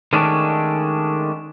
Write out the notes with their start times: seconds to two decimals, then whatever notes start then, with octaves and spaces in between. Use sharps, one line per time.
0.13 D#3 G#3 A3 C#4 D4